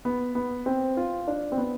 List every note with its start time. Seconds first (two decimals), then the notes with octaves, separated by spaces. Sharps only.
0.05 B3
0.35 B3
0.66 C4
0.97 F4
1.27 D4
1.52 C4
1.58 B3